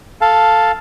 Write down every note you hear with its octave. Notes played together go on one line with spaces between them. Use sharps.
A4 F5 A5